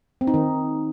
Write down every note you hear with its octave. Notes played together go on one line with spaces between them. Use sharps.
C4
D#4
D#3